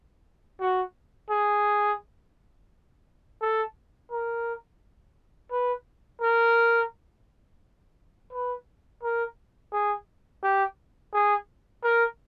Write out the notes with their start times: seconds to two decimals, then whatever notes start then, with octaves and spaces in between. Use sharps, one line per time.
0.61 F#4
1.30 G#4
3.41 A4
4.11 A#4
5.51 B4
6.21 A#4
8.33 B4
9.03 A#4
9.73 G#4
10.43 G4
11.14 G#4
11.83 A#4